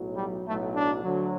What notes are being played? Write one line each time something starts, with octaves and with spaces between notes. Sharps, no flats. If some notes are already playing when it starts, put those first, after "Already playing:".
Already playing: B1 A2 F#3
G3
B1 A2 F#3 A3
D4
D2 D3 F#3